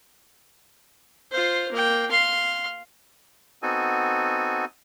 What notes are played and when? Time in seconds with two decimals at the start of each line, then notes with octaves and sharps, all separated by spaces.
1.32 F4 C5
1.72 A#3 G5
2.11 F5 C6
3.63 B3 C4 D#4 F#4 A4 G#5